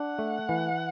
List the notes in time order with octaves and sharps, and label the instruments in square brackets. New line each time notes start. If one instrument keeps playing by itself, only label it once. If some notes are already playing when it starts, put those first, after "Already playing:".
Already playing: [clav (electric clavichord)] D4 [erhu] F#5
[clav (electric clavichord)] A3
E3